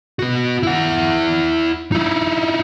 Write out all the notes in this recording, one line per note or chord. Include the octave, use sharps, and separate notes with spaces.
B3 F#4
E4 F#5
D#4 E4